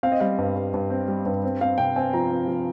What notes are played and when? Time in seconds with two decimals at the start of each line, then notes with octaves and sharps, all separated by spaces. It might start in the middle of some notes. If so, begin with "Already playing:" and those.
0.03 C4 F5
0.12 D#5
0.20 G3 F5
0.38 G2
0.56 G2
0.74 G2
0.90 C4
1.08 G3
1.26 G2
1.44 C4
1.61 C4 F5
1.78 C3 G5
1.96 C4 G#5
2.13 F3 A#5
2.31 C4
2.48 F3